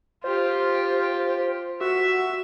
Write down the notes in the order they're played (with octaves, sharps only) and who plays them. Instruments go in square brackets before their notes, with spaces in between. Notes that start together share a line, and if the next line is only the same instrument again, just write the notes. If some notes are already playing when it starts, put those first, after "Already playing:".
[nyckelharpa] F4 G4 [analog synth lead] C5
[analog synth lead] F#4 [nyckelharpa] E5